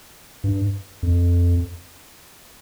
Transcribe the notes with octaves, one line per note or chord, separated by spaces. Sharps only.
G2
F2